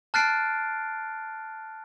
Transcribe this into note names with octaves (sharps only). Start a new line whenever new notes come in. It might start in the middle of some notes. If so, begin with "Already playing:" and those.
A5 F6 F#6 A6 C7 D7